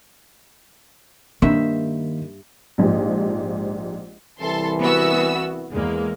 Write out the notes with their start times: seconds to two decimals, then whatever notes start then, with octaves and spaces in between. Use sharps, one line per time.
1.42 G2 D#3 A#3 C5 E5
2.78 A#1 G#2 F3 G4
4.40 C2 E3 A4 C6
4.81 B3 F#4 E6
5.72 E2 G#3 A#3